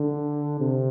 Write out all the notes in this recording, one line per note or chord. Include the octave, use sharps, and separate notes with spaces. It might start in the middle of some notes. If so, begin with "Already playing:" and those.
Already playing: D3
C3